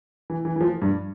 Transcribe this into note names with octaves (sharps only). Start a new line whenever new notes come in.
E3
E3
E3
F3
G2